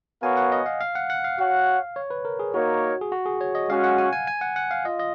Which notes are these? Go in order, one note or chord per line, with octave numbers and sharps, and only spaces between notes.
B3 F#4 A#4 C#5 F5 G#5
F#5
D#5
F5
F5
F#5
F#5
F5
F#4 C#5 F#5
C#5
B4
A#4
G#4
A#3 D#4 F#4 A#4 C#5
G#4
F#4
G#4
C#5
D#5
G#3 C#4 F#4 F5
F#5
G#5
G#5
G#5
F#5
F#5
F5
F4 D#5
D#5